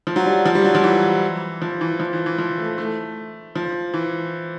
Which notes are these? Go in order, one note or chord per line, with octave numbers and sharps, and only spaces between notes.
F3
F#3
G3
F3
G3
F#3
F3
E3
F3
E3
F3
E3
E3
F3
A3
A3
F3
E3